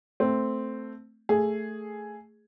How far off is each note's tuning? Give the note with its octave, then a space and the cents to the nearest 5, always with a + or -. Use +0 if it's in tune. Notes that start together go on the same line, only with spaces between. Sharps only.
A3 +0 C4 -5
A3 +0 G#4 +0